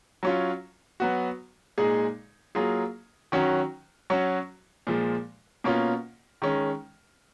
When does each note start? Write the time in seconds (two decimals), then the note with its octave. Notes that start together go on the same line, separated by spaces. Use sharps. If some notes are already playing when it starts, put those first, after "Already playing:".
0.23 F#3 C#4 F4
1.00 F#3 B3 F#4
1.78 A#2 G#3 D#4 G#4
2.55 F#3 A#3 F4 G#4
3.32 D#3 F#3 C#4 F#4
4.10 F#3 C#4 F#4
4.87 A#2 F3 G#3
5.64 B2 A#3 C#4 F4
6.42 D#3 G#3 C#4